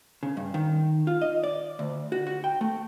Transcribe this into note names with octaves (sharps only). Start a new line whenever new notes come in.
C#3
G2
D#3
F4
D#5
D5
D2
F#4
F#4
G5
A3